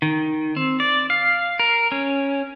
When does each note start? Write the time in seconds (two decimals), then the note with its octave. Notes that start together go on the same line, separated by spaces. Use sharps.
0.02 D#3
0.56 C4
0.80 D5
1.10 F5
1.59 A#4
1.92 C#4